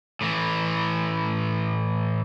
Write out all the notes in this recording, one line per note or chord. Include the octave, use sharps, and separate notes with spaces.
A2 E3